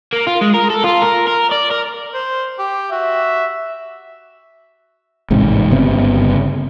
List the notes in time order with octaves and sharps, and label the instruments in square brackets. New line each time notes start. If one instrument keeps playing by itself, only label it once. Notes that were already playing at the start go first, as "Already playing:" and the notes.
[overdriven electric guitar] A#3
F4
G#3
A#4
A4
F4
A#4
A#4
D5
A#4
[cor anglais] C5
G4
[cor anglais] F#4 [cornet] E5
[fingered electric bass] A1 G#2 C3
G1 C#3 B3 C4